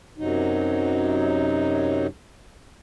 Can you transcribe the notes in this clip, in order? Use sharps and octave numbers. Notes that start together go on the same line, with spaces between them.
F#2 C3 F#3 D#4